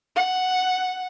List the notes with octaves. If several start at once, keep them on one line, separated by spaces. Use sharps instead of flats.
F#5